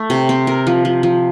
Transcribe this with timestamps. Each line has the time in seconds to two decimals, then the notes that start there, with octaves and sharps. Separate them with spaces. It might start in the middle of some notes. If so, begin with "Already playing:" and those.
Already playing: A3
0.10 C3
0.29 C4
0.47 A#4
0.67 F3
0.85 F3
1.03 F3